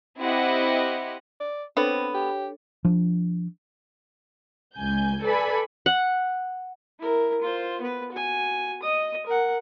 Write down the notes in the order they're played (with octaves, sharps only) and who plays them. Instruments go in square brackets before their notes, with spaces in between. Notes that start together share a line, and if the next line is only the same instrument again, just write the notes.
[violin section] C4 E4 G4 D#5 F#5
[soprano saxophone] D5
[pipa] B3 [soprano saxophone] C4 [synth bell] D4 A4 C#5
[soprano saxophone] G4
[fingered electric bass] F3 D4
[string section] C#2 G#5 G6
A4 B4 D5 G#5 B5
[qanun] F#5
[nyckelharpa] E4 A#4
F4 C5
B3 B4
F#4 G#5
D#5 D#6
A#4 F#5